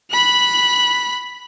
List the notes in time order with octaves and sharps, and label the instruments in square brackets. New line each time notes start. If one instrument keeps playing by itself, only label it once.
[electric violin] B5 F#6